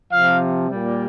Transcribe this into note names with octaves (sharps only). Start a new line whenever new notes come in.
C3 F3 F5
A#2 G3